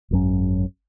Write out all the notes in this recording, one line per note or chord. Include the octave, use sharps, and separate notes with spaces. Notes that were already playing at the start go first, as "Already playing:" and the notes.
G#1 F#2 F#3 C#4